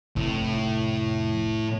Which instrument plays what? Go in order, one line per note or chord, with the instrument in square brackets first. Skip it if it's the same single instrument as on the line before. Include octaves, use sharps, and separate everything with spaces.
[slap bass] F1 [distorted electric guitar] A2